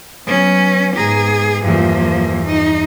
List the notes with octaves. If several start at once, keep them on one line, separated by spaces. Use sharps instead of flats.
F#3 B3 C#4
G#2 B3 G#4 A#5 B6
E2 G2 F3 A#3
D#4